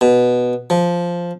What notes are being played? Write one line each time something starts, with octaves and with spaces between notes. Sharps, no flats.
B2
F3